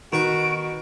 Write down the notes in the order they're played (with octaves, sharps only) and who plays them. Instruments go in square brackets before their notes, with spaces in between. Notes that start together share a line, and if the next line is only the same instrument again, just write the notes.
[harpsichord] B2 B4 C#6 [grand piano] D#3 [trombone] F#4 [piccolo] D7